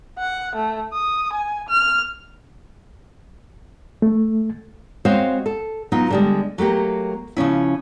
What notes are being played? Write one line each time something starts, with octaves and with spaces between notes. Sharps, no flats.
F#5
A3
D#6
G#5
F6
A3
G#3 C4 F#4 C5 C#5 F5
A4
F#3 B3 D#4 F4
D3 G3 G#3
F#3 A3 A#3 G4
C#3 F3 C#4 E4